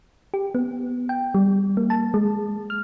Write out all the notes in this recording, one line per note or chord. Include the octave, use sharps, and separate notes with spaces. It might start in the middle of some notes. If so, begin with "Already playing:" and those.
G4
B3
G5
G3
A#3
A5
G#3
F6